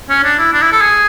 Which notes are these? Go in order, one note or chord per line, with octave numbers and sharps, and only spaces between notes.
C#4
D4
E4
D4
E4
A4
G#4